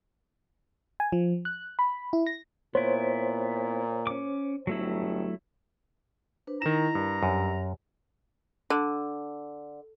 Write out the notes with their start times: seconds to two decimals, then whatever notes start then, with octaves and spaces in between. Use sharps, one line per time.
1.00 G#5
1.12 F3
1.45 F#6
1.79 B5
2.13 E4
2.27 A#6
2.75 A#2 B3 E4 C5 C#5
4.07 C#4 D6
4.67 G1 F#3 A3 E4
6.47 D4 B4 C5
6.62 D#3 E4 D#5 A#5 E7
6.95 G2 E4 A#4
7.23 F#2 G4
8.70 D3